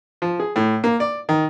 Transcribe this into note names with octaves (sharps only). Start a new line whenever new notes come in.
F3
G#4
A2
A#3
D5
D#3